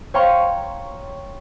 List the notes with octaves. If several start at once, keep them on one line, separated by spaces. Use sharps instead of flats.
C#5 F5 G5 A#5 C6 C#6